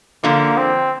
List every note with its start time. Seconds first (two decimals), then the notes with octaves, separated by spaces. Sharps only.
0.24 D3 F3 A#3
0.57 C4